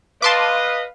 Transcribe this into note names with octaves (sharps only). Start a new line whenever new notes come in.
B4 D#5 F5 A5 C6 D6